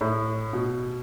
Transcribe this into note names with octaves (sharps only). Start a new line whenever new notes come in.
A2
B2